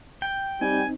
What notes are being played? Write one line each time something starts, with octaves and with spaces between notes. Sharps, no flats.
G5
G3 C4 D#4 G#5